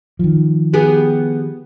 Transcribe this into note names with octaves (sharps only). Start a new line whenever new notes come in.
D#3 F3
B3 G4 G#4